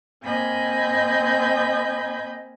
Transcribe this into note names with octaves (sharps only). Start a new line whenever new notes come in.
A#3 C4 D#5 G#5 B5 G6